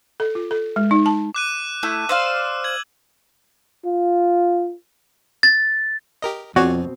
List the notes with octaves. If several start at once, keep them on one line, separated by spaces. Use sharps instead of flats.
A4
F4
A4
G#3
D#4
A5
D6 F#6 D#7
A3 E4
C5 D5 F5 E6
G#6 F#7
F4
A6
G4 A#4 D#5
F2 B2 C4 F#4 C#5 D5 G#5